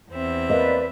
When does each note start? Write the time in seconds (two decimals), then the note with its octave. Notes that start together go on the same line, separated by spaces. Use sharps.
0.11 E2 C4 E5
0.50 A#3 B4 D5 D#5